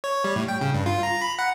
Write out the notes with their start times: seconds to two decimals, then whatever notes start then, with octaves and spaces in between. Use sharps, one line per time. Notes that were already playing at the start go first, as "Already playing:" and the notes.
0.04 C#5
0.24 G3
0.36 A2
0.48 G5
0.61 C#3
0.74 G2
0.86 F4
1.03 A#5
1.22 B5
1.39 F#5